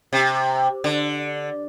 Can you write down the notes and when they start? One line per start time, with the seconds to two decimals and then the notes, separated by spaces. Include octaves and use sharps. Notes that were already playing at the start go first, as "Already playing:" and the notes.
0.13 C3
0.84 D3